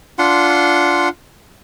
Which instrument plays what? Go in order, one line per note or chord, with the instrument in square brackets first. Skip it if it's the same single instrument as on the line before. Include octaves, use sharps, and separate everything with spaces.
[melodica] D4 F4 F#5 C6